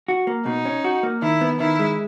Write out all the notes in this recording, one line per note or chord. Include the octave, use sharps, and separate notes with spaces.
F#4
A#3
B2 D#4
C#4
F#4
A#3
D#3 E4
B3
D#3 E4
G#3